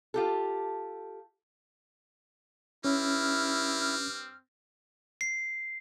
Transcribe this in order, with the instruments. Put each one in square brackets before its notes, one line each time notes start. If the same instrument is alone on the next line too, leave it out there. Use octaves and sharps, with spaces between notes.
[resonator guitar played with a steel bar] F4 G4 A4
[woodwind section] G2 D6 F6 [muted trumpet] C4 [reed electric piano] C#4 [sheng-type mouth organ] E4
[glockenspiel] C7